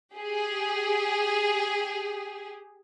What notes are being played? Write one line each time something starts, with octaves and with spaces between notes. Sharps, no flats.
G4 G#4